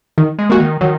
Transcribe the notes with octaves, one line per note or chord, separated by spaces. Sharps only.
D#3
G#3
A#3 F#4
D#3
D#3 F#3